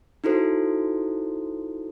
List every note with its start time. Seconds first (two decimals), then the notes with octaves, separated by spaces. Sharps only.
0.24 D#4 E4 F#4 A4 C5